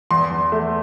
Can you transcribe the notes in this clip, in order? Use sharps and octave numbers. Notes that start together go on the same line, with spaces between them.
E2 C6
E2
A3